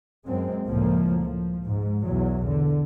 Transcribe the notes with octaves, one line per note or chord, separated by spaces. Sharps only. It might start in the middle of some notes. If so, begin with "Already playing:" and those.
F#2 G#3 C4
C#2 A2 F3 A#3
F3
G#2
B1 E2 F#3
D3